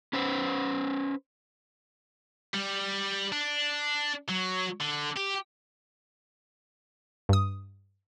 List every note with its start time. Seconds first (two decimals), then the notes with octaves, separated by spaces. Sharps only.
0.13 C#4 B4 C5
2.54 G3
3.32 D4
4.29 F#3
4.80 D3
5.16 G4
7.29 G2 D#6